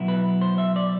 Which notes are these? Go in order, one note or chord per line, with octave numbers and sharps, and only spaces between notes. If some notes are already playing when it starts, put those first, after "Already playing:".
Already playing: B2 F#3 B3 E4
B4
C5
E5
D5